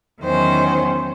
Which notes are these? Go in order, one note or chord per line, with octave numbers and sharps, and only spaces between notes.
E2 D#3 F#3 C#4 C5